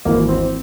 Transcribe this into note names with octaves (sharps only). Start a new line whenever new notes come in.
G#1 G#2 E3 A#3
C4